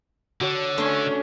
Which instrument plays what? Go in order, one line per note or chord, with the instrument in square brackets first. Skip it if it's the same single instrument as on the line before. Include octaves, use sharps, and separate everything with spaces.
[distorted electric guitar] D3 [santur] F#4 C#5
[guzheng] A3 C6 [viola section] C#4 D4 [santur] B4